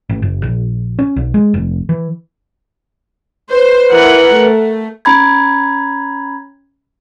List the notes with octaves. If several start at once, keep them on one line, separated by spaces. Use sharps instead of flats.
A1
F#1
A#1
C#4
B1
G#3
F1
E3
B4 C5
E3 A#4 F#5
A3
C#4 A#5 B5 G#6